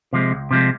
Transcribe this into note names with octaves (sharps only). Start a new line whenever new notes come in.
C3 F3 G#3
C#2
C3 F3 G#3